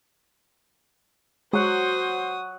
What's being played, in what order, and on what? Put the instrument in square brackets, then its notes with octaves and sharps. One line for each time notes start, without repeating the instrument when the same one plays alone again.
[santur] F#3 F#5 [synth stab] G#3 [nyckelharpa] F#4 D#6 [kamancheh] C5